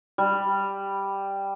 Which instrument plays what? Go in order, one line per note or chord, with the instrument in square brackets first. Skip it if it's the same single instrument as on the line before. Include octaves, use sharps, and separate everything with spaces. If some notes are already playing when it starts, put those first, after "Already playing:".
[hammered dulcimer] G3